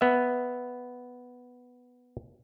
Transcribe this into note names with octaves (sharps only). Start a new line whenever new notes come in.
B3 E5